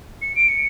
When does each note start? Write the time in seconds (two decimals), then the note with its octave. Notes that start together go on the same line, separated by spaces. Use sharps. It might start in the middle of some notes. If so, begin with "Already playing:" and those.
0.22 C#7
0.36 D7
0.49 C#7